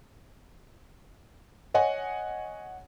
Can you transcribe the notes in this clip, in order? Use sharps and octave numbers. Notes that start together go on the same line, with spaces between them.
C#5 D#5 F#5 G#5